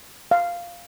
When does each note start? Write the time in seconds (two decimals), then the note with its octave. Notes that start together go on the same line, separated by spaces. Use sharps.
0.31 F5